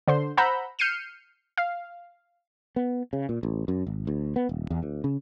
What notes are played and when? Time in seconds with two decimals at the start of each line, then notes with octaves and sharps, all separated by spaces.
0.08 D3 C5 C6
0.37 C5 F#5 A#5 B5 E6 G6
0.79 F6 G6 C7 C#7 D#7 E7
1.58 F5
2.76 B3
3.13 C#3
3.29 A#2
3.43 A1
3.68 F#2
3.87 G#1
4.07 D2
4.36 B3
4.49 D#1
4.70 E2
4.83 D2
5.04 C#3